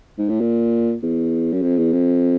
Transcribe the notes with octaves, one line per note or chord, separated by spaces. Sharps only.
G#2
A2
A#2
E2
F#2
F2
E2
F2